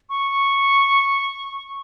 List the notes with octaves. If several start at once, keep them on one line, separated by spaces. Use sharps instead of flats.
C#6